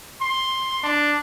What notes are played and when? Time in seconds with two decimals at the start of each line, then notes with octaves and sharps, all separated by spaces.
0.21 C6
0.83 D4